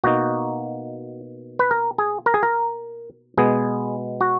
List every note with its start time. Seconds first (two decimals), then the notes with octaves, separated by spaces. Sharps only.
0.04 B2 A#3 D#4 F#4
1.59 B4
1.71 A#4
1.98 G#4
2.26 A#4
2.34 G#4
2.43 A#4
3.37 B2 G#3 B3 G#4
4.21 F#4